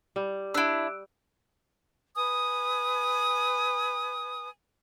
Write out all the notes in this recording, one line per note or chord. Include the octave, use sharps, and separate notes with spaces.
G3
D4 E4 E6 F#6 D7
B4 G#5 D#6